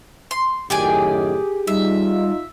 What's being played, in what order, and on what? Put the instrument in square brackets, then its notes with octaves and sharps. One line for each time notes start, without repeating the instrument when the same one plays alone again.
[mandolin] C6
[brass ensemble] F#2 A2 D#3 [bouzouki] G4 G#4 [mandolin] D5 G5 G#5
[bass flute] G3 [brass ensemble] D#4 F4 [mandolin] E5